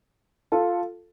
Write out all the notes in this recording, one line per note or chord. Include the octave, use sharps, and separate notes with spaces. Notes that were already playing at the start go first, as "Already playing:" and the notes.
F4 A4